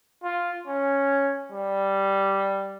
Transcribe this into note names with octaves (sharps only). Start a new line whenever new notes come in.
F4
C#4
G3